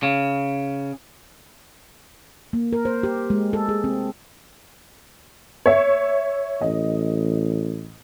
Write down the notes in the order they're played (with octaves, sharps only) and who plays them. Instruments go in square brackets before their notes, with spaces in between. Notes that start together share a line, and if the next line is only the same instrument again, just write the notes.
[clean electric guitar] C#3
[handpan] A#3
A#4
C5
G4
G#3
A4
G#4
C4
[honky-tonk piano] C#5 E5
[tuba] A1 [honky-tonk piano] D#5